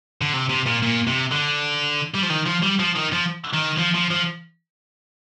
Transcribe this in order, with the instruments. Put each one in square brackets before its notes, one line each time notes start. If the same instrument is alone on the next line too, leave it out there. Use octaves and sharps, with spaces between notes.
[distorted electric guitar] D3
C3
C3
A#2
A#2
C3
D3
G3
F3
D#3
F3
G3
F3
D#3
F3
D#3
F3
F3
F3